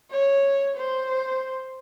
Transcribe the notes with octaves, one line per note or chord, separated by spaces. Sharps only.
C#5
C5